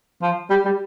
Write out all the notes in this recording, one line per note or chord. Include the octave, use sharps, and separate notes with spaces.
F3
G3
G3